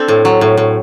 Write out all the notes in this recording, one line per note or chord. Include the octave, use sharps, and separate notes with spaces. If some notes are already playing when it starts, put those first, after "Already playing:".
Already playing: C4 D4 A4
A2
F#3
A2
A2